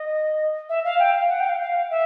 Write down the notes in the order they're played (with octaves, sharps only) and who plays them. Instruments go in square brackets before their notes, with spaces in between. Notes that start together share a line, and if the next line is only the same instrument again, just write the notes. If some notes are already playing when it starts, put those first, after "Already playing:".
Already playing: [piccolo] D#5
E5
F5
G5
F5
F#5
G5
F5
F5
E5